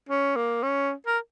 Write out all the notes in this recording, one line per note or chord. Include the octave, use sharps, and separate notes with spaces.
C#4
A#3
C#4
A#4